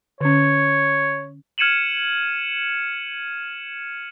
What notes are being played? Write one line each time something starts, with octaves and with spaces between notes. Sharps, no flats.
D3 C#4 C#5
F6 G#6 C#7 D#7 E7 F#7